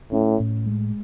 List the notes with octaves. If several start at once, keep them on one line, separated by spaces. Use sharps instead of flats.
A2 C#4
A2
G#3